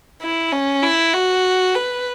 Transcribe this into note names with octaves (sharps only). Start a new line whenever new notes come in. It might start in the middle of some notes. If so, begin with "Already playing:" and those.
E4
C#4
E4
F#4
B4